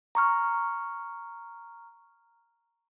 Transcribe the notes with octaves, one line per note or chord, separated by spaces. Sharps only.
A#5 C#6 F6